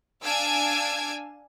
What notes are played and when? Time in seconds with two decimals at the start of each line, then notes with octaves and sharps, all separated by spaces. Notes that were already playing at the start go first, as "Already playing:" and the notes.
0.23 D4 F5 G#5 E6 G#6 D7